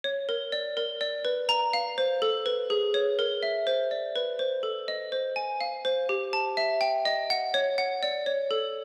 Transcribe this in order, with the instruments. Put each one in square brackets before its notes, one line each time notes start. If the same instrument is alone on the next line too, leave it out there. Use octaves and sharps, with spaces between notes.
[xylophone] C#5
A#4
D5
A#4
D5
B4
A#5
F5
C5
A4
B4
G#4
C#5
A#4
E5
C5
D5
B4
C5
A4
D#5
C5
G#5
F5
C5
G4
A5
E5
G5
D#5
F#5
C#5
F#5
D5
C#5
A4